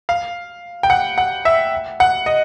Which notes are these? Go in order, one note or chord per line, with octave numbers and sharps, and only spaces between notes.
F5
G5
F#5
F#5
E5
F#5
D#5